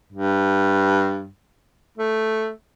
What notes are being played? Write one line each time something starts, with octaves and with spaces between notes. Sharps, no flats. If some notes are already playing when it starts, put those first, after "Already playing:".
G2
A3